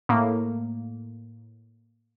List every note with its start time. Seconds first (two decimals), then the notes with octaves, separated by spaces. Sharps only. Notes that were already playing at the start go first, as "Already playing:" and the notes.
0.09 A2 A#3